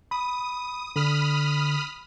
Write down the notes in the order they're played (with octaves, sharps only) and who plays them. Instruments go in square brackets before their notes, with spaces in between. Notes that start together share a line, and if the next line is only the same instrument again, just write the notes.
[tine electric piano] B5 [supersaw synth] D#6
[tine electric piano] D3 [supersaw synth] B5 D#6 F6